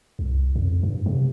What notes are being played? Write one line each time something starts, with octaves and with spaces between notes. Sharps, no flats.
C2
F2
G2
C3